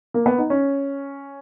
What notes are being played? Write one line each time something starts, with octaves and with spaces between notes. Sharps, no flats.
A#3
B3
D#4
C#4